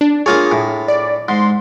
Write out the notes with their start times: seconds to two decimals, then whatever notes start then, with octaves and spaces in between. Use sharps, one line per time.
0.01 D4
0.26 A#3 F4 G#4 C#5
0.52 A2
0.88 D5
1.28 G#2 C6